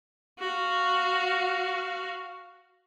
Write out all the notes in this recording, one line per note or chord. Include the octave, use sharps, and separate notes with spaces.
F#4 F5